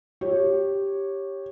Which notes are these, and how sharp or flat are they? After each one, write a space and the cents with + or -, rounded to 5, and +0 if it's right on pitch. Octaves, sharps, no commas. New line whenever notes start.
G4 +0 C#5 -10